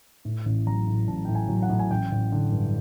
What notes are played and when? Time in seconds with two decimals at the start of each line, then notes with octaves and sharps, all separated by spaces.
0.25 A2
0.45 A1
0.67 F#3 A#5
0.87 A2
1.08 A1 A5
1.25 A2 G5
1.35 G#5
1.49 F#3
1.62 F#5
1.69 A2
1.79 G#5
1.91 A1 G5
2.12 A1
2.32 D3
2.52 G2